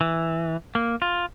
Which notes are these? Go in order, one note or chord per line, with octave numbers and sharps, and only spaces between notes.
E3
A#3
F4